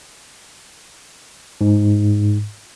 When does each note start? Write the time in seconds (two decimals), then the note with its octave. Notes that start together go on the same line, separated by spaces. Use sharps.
1.61 G#2